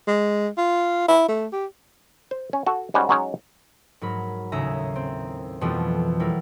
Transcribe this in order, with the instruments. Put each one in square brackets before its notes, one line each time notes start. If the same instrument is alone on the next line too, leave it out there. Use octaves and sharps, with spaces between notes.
[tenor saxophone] G#3
F4
E4
A3
G4
[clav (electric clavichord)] C5
C#4
F#4 A4
G#2 G3 C#4 F#4 G4
F#3 G#3 C#4 D#4 C#5
[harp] G#2 F#3 A#4 B5
D#2 A2 C#3 G#4 E5 A#5
C4
F2 B2 E3 F3 G3 A3
F#3 G3 E4 A#4